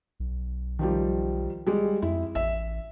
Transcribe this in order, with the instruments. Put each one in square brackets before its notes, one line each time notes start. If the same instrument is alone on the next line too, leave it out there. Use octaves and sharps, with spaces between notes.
[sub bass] B1
[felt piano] D#3 F3 G3
G3 G#3
[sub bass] F2 [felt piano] E4
[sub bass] A1 [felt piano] E5